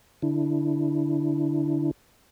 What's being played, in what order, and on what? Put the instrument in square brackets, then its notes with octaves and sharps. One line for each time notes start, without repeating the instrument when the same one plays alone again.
[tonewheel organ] D3 D4 E4